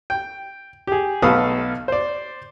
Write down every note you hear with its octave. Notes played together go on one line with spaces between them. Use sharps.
G5
G4 G#4
B1 A3 A4 B4 F5 D#6
C5 D5